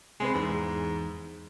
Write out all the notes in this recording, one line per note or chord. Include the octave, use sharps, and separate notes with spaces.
C2 G#3 C4 B4
E2 G#2